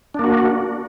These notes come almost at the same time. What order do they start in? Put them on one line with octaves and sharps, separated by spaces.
D4 A#3 F#4